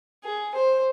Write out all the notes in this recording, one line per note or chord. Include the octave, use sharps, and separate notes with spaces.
G#4
C5